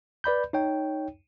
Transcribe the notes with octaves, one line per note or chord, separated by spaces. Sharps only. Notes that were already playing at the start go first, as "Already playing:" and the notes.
B4 D5 B5 G6
D#4 C#5 G5